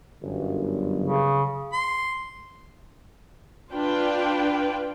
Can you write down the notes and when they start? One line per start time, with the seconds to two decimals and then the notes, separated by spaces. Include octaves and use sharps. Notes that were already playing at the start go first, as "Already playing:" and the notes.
0.22 G1 F#2
1.01 C#3
1.73 C6
3.72 D4 F4 B4 G5